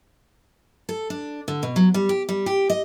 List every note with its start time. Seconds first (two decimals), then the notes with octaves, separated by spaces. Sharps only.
0.89 A4
1.10 D4
1.48 D3
1.63 B2
1.76 F#3
1.94 G3
2.09 G4
2.29 G3
2.46 G4
2.70 D#5